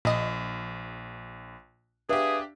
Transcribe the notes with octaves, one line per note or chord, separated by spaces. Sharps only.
A#1 A#2 D#5
D4 G4 G#4 B4 E5 F5